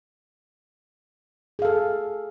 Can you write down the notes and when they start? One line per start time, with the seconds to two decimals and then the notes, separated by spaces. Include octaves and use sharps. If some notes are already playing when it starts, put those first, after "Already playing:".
1.59 G#4
1.62 F5
1.65 A4